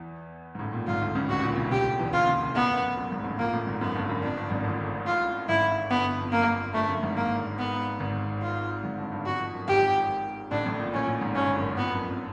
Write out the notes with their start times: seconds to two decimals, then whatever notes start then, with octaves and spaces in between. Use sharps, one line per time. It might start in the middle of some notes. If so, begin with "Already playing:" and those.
Already playing: E2 E3
0.55 G#2
0.59 A1 A2
0.73 A#1 A#2
0.87 G#1 G#2 F4
1.01 D2 D3
1.15 C#2 C#3
1.29 A1 A2 F#4
1.43 A#1 A#2
1.57 B1 B2
1.71 C#2 C#3 G4
1.85 D2 D3
1.99 E2 E3
2.13 D#2 D#3 F4
2.27 C#2 C#3
2.41 C2 C3
2.55 A1 A2 B3
2.76 F#2
2.97 F#2
3.11 G#1 G#2
3.24 A1 A2
3.39 A#1 A#2 A#3
3.53 A1 A2
3.66 G#1 G#2
3.81 F#2 B3
3.95 G1 G2
4.09 F#2
4.23 F2 D4
4.37 G1 G2
4.50 G#1 G#2
4.64 A1 A2
5.07 F4
5.48 G#1 G#2 E4
5.90 G1 G2 B3
6.18 F2
6.32 F#2 A#3
6.74 G1 G2 A3
6.88 F#2
7.03 G#1 G#2
7.16 A#3
7.59 B3
8.00 G#1 G#2
8.42 F4
8.83 G#1 G#2
8.98 G1 G2
9.12 G1 G2
9.25 F2 F#4
9.40 F2
9.53 F#2
9.68 G#1 G#2 G4
10.51 A1 A2 D4
10.66 A1 A2
10.79 A#1 A#2
10.93 A#1 A#2 C#4
11.07 A1 A2
11.21 G#1 G#2
11.35 G1 G2 C#4
11.56 F#2
11.77 F2 B3
11.91 F#2
12.05 F2